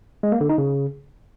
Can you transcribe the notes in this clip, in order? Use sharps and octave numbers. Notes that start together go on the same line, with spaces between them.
G#3
A#3
D3
D#4
C#3